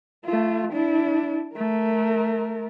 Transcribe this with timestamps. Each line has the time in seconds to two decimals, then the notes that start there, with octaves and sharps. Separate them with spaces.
0.25 A3 F4
0.73 D4 E4
1.55 A3 A#4